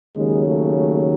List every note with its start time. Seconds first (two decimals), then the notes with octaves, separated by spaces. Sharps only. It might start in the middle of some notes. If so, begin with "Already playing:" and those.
0.15 D#2 C#3 F#3 G#3
0.46 A3
0.77 A3